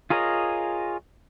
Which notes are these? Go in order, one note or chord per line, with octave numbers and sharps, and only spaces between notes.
F4 G#4 A#4 C#5 D#5